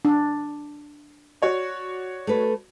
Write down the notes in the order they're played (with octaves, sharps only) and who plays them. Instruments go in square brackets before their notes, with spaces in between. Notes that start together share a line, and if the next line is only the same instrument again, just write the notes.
[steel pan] D4
[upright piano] F#4 C#5 D5
[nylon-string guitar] A3 B4